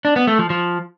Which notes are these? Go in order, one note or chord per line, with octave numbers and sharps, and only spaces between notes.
D4
B3
A3
F3
F3